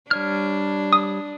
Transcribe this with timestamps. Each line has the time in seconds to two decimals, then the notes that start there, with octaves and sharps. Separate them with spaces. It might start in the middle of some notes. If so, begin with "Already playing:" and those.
0.11 G3 D4 C#5 F6
0.93 D#6